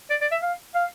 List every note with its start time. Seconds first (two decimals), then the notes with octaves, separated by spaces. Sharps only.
0.10 D5
0.21 D5
0.31 E5
0.42 F5
0.75 F5